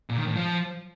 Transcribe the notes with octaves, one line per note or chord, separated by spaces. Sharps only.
A#2
D#3
A2
F3